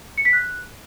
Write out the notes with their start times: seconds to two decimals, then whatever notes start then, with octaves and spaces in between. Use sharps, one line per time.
0.18 C#7
0.25 B6
0.33 F#6